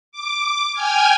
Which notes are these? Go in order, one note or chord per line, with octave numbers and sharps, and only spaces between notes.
D6
G5 G#5 F6 G#6